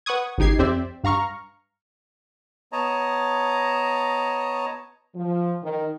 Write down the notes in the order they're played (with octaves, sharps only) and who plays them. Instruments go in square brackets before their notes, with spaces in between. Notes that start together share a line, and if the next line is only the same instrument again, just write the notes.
[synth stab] B4 F#5 C#6 D#6 G#6
G#1 C#2 D#4 G4 G#6 C7
F2 C4 G4 C5 D5 E5
G2 F5 A#5 C#6 F6
[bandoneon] B3 C#5 D#5 A5 A#5
[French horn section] F3
D#3